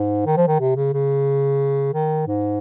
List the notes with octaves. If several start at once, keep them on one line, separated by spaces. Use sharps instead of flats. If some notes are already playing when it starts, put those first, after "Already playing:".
Already playing: G#2
D#3
F3
D#3
C3
C#3
C#3
D#3
G#2